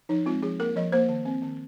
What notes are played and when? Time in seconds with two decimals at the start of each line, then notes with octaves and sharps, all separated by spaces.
0.09 F3 D#4
0.26 G#3 C4 F4
0.42 F3 G#4
0.59 A#3 A#4
0.76 F3 D#5
0.92 A#3 C5
1.09 D#3
1.25 C4
1.42 D#3